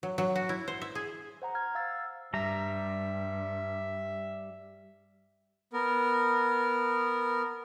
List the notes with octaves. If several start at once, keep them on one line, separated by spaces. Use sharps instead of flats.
F#3
F#3
F#4
E4
C5
E5
G#4
C5 F#5 A#5
F#5 F6 G#6
F5 E6 A6
G2 G3 E5 A#5
B3 A#4